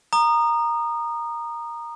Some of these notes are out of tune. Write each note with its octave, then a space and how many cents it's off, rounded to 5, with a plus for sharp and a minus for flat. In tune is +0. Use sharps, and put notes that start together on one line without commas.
A#5 +0 D#6 -25